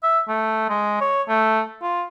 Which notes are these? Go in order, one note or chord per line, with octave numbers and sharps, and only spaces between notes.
E5
A3
G#3
C#5
A3
F4